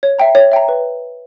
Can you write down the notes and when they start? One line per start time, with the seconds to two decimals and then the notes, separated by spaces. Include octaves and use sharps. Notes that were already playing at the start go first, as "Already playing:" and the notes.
0.03 C#5
0.19 E5 G5 A#5
0.35 C#5
0.52 E5 G5 A#5
0.69 B4